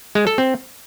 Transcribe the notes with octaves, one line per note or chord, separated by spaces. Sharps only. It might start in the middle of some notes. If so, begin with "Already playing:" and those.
G#3
A4
C4